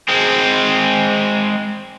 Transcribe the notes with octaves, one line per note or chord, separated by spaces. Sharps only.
G#3 C4